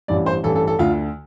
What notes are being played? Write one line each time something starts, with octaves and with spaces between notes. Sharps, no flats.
A1 G2 E3 D5
C5
A1 G2 E3 A4
A4
A4
D2 D3 F4